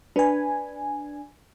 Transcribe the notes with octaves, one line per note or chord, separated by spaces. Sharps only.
D4 B4 G#5